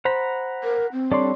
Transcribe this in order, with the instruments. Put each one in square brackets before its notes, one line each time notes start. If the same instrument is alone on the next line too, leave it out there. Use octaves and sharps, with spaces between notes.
[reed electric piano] C5 [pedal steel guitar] F#5 A#5 B5
[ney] A#4
C4
[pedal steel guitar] G3 D4 A4 [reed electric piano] C#5 D5 C6